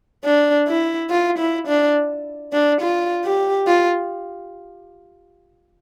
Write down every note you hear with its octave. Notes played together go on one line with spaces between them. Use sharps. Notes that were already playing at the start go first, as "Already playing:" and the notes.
D4
E4
F4
E4
D4
D4
F4
G4
F4